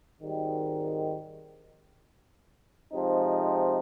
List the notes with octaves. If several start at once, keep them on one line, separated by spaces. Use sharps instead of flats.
G#1 G#2 D#3 G3
C3 F3 G#3 C4 D#4